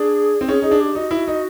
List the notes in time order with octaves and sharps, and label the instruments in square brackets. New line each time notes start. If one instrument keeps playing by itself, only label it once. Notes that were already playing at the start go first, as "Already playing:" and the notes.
Already playing: [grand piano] D4 [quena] G#4
[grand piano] C4
[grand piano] C#4 [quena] G#4
[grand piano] D#4 [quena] G#4
[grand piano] D4
[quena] G4
[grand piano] D#4 [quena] F#4
[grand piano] E4
D#4